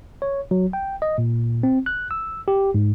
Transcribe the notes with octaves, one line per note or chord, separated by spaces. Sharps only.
C#5
F#3
G5
D#5
A#2
C4
F#6
E6
G4
G#2